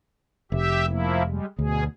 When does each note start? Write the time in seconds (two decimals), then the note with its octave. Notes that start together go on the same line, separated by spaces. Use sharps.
0.52 F1 G4 E5
0.88 F3 A#3 E4
1.25 G3 G#3
1.59 D2 B2 G#4